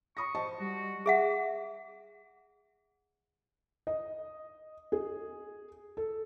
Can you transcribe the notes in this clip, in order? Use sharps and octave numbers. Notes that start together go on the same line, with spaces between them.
B5 C#6 D#6 A#6
C5 D#5 A5
G3 F#4
G#4 E5 F#5
D#5
G#4
A4